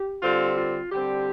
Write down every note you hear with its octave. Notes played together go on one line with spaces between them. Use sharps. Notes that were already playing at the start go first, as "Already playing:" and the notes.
Already playing: G4
D3 G3 C4 F4 A4
F4
D3 G3 C4 G4